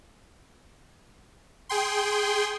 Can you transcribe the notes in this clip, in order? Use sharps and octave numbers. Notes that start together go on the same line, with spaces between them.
G#4 G5 C6